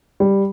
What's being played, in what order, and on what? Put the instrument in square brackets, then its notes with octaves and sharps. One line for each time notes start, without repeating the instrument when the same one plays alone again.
[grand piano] G3